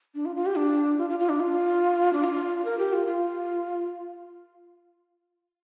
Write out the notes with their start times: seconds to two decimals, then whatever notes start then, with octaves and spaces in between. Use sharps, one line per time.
0.15 D4
0.25 F4
0.36 F4
0.46 G4
0.57 D4
0.98 F4
1.09 F4
1.20 F4
1.29 D4
1.40 F4
2.13 D4
2.24 F4
2.65 A#4
2.79 G4
2.93 F4
3.07 F4